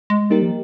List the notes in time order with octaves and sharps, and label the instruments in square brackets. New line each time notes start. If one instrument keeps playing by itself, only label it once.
[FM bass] G#3
[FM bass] G3 [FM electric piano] A#3 D#4 G4 A#4
[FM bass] F3